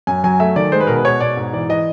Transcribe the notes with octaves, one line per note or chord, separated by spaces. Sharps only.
F#2 G#5
F#3 G#5
A3 E5
D#3 D5
G#3 C5
B4
B2 A#4
B4
B2 C#5
B2 D5
G#2
E3 D5
E3 D#5